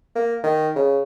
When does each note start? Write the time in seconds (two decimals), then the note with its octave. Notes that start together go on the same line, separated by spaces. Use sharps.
0.15 A#3
0.43 D#3
0.76 C#3